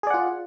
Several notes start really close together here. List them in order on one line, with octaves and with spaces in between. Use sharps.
G#4 D5 F#5 F4